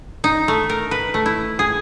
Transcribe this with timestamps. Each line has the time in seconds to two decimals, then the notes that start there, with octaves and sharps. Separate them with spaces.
0.24 D#4
0.48 A3
0.70 A#4
0.91 B4
1.14 A3
1.26 E4
1.59 G#4